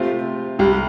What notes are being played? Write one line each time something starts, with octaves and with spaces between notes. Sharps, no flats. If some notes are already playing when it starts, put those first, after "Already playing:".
Already playing: C3 A3 F4 C5
C2 C3 G3